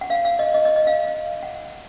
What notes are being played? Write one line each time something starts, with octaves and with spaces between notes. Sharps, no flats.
F#5
F5
F5
D#5
D#5
D#5
D#5
F5
F#5